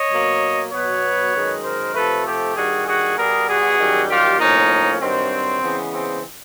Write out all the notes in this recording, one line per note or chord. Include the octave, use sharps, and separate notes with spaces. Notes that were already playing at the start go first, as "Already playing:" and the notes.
Already playing: C#5 D#5
B2 F#3 A#3
B2 F#3 B3 B4 C#5
F#2 D#3 G#3
A#4 C5
C3 F3 A3 A4 B4
G4 A4
G2 D#3 G3 F#4 G#4
F#4 G#4
B2 G3 B3 G#4 A#4
F#4 G#4
F#2 D#3 G3
F4 G4
A2 F3 A#3 C#4 D#4
G2 D#3 F#3 C4
C#3 E3 G#3 B3
C4